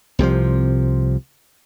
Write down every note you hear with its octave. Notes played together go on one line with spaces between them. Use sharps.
C2 C3 D#3 F3